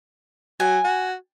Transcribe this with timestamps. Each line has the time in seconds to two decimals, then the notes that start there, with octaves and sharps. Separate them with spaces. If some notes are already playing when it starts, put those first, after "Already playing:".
0.60 F#3 G#5
0.84 F#4